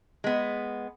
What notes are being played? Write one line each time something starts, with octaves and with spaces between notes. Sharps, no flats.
G#3 B3